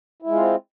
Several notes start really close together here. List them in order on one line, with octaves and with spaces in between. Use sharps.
E4 G#3 F4 C4